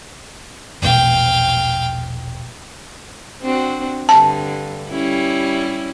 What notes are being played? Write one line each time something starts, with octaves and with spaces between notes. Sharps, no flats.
E1 A#1 B2 F5 G5
C4 D4 F#4
G2 D3 A5
G3 C#4 E4